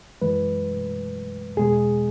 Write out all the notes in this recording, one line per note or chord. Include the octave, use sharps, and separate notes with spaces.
F#2 E3 G#3 B4
E2 B2 G#3 G#4